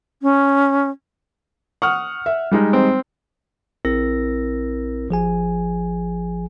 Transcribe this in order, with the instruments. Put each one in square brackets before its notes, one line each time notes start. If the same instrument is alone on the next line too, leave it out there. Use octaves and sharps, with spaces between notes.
[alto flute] C#4
[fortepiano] F#5 [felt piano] C#6 D#6 F6
[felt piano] E5
G3 G#3 D#4
[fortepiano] C4
[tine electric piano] A#1 C4 E4 A#4 E6 A#6
G#1 F3 G#4 G#5